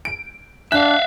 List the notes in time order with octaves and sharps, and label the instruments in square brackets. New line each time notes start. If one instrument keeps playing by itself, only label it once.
[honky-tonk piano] D7
[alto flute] D4 [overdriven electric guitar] E5 F5 [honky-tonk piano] F#6